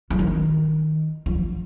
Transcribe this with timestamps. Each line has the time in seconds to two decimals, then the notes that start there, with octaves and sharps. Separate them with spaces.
0.10 F3
0.19 D#3
1.26 F3